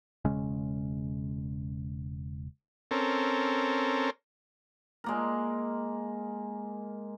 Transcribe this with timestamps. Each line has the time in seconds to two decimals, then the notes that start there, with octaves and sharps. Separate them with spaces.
0.25 E1 C#3 G#3 C#4
2.91 C4 C#4 A4 A#4
5.04 G#3 A#3 A#4